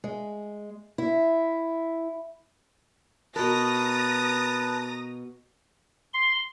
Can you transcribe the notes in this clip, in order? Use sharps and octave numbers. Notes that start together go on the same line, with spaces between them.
G#3
E4
B2 A#4 B4 A5 A#5 D#6 A#6
C6